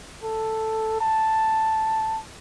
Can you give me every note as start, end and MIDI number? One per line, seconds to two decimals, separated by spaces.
0.24 1.00 69
1.01 2.20 81